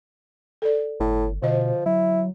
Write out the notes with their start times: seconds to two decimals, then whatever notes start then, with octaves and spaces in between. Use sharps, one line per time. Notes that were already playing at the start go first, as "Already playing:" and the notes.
0.62 A4 D5
1.00 G1 A2
1.42 B2 D3 F3 D#5
1.86 F#3 E4